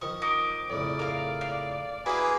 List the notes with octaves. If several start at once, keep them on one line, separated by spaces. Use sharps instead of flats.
D#3 F3 D#5 C#6
D#4 D6
F2 A2 C#3 D5
A#4 F5
F5
A#3 E4 F#4 G#4 B4 C5